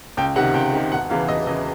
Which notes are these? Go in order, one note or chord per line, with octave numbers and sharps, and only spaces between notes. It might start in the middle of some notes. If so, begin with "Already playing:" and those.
C#2 G5
C3 D#3 F#5
C#2 G5
C3 D#3
E1 F#5
E2 C#3 E3 F5
E1 D#5
C#3 E3 D#5